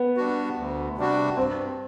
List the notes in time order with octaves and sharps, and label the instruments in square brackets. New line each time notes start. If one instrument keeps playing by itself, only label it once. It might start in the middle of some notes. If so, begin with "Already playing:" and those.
Already playing: [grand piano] B3
[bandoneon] G3 D4 F#4
D2
C3 G3 D4 F#4
[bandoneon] G2 [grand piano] C4